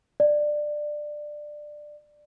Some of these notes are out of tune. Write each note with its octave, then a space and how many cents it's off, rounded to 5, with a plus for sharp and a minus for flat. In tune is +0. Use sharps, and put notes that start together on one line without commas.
D5 +15